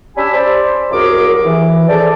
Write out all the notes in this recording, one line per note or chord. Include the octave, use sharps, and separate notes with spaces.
C#4 D4 G4 G#5 B5 E6
C5 D5
C2 F#2 F#4 G#4 A#4 D6
E3
G#4 A4 C5 D5